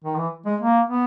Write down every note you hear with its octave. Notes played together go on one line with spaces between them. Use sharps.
D#3
E3
G#3
A#3
B3